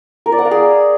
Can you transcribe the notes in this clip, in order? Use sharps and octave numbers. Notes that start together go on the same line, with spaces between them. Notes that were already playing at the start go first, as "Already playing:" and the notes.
A#4
D5
F#5
F5
G#4